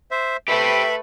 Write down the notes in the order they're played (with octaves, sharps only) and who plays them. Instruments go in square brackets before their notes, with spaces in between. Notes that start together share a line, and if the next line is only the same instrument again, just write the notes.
[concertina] C5 E5
[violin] A3 B4 [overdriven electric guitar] G4 C5 [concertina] E5 B5